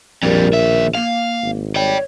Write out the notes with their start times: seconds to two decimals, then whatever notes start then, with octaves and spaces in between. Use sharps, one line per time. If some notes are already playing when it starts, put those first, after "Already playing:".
0.23 A#1 F2 G3 A#4
0.53 D#2 E5
0.95 A#3 F5
1.43 G#1
1.76 C#5 D5 G5